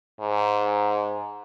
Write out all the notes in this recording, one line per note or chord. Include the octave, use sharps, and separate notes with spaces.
G#2